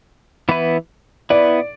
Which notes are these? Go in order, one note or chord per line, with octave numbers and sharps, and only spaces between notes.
E3 B3 E4 B4
B3 E4 B4 D5